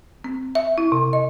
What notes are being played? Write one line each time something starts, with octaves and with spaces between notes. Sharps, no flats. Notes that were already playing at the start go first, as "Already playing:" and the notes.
C4
E5
E4
C3
D#5